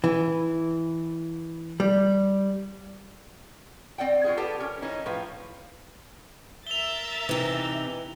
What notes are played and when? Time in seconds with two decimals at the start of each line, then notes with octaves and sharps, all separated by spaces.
0.04 E3
1.80 G3
3.98 C4 D5 F#5 G5
4.24 F#3 F4 G#4
4.37 G4 A4 B4 F#5
4.60 C#4 A#4
4.82 E3 C#4 D#4
5.06 A2 F3 B4
6.67 A#4 E5 A6 F7 G7
7.29 C3 E3 D#4